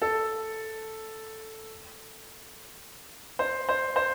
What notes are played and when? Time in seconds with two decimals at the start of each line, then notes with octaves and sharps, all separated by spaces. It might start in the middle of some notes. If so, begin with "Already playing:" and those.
0.02 A4
3.39 C5
3.69 C5
3.96 C5